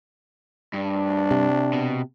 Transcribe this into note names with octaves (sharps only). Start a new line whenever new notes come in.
G2 D4
C3
B2